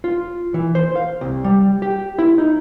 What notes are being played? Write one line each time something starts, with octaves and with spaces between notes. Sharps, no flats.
F4
E3
C5
F5
C2
G3
G4
E4
D#4